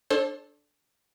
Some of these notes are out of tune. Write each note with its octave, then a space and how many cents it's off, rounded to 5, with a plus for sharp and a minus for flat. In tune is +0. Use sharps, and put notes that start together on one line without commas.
D4 +0 A4 -10 C5 +45